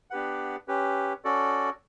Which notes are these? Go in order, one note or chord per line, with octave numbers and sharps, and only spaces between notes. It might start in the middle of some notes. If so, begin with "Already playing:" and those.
B3 D4 G4 B4 F#5
C#4 G4 B4
C#4 F#4 A4 D5